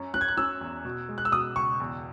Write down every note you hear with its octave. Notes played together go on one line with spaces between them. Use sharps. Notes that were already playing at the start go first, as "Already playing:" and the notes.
Already playing: F#2 C#4
C#4 F#6
G#6
F#6
C#4 E6
E2
B2
G#3
F#6
E6
B2 D#6
C#2 C#6
E2